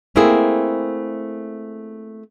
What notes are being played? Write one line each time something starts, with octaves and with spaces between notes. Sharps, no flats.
A3 A#3 C4 E4 G#4